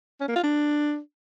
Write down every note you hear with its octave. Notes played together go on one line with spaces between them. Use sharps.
C#4
A#3
F4
D4